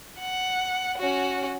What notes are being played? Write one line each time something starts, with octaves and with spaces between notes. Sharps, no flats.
F#5
C#4 F#4